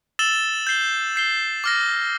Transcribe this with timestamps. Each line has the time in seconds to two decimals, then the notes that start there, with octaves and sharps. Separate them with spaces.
0.19 E6 A6 E7 G7
0.67 G6 C7 G7
1.16 G6 C7 G7
1.64 D6 F6 A#6